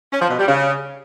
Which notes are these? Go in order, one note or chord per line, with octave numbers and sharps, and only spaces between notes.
C#4
F3
B2
G3
C#3